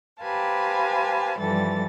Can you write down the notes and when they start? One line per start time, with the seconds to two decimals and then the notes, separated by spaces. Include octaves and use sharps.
0.21 G4 B4 C5 F5 G#5 A5
1.38 G2 E3 F3 G3 A4 A6